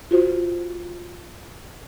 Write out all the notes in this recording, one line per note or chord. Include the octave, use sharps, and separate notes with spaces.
F4 F#4 C5